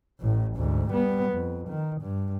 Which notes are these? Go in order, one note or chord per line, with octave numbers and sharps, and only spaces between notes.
A1 A2
D2 G#2
G3 B3
F2
D#3
G2